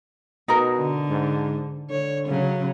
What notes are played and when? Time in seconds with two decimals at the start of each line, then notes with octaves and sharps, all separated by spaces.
0.48 B2 D#4 A#4
0.77 D3
1.10 G#2
1.90 D3 C#5
2.28 C#3 F#3